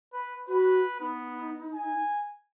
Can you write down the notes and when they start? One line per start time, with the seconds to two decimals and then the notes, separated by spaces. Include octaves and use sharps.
0.13 B4
0.48 F#4 B4
1.00 B3 D#4
1.74 G#5